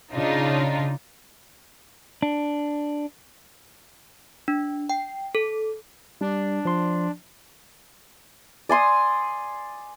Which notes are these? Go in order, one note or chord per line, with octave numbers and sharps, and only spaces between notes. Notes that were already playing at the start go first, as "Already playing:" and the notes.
C#3 D4 D#4 F4
D4
D4
G5
A4
G3 D4
F3 C6
D5 G#5 C6 D#6